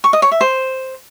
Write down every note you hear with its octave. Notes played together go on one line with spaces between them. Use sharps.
C#6
D#5
C#5
E5
C5